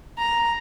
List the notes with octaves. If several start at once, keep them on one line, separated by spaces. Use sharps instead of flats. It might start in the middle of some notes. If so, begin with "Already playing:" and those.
A#5